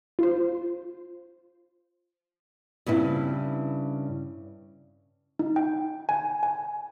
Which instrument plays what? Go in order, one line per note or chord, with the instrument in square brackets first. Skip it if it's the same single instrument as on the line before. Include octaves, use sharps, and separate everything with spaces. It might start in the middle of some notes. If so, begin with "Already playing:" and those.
[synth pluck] F4 C5
[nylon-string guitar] G2 C#3 C4 E4
[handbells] D#4
G5
G#5
G#5